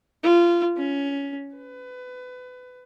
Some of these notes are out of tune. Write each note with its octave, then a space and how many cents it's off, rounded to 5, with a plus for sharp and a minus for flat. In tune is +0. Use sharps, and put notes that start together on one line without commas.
F4 -20
C#4 +15
B4 +25